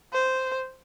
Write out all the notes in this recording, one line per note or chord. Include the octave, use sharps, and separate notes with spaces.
C5